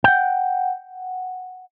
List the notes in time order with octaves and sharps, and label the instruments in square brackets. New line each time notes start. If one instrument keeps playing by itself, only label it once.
[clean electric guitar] F#5 G5